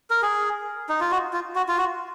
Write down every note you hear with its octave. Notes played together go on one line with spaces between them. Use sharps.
A#4
G#4
D#4
F4
F#4
F4
F#4
F4
F#4